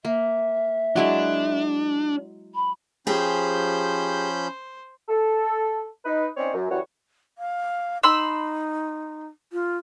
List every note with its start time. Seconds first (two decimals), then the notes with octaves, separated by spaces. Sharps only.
0.05 A#3 E5
0.96 F#3 G#3 D4 E4
2.55 B5
3.07 F3 C#4 G4 G#4 C5 B5 G6
5.09 A4
6.05 D#4 B4
6.37 C4 C#4 D#4 C#5 D5
6.54 F#2
6.70 F#2 E3 G3 F#4 C#5
7.38 F5
8.03 D#4 B5 C6 E6
9.52 F4